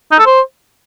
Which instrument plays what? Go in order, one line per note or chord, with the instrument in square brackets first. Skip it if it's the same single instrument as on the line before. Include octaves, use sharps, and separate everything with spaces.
[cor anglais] D#4
A4
C5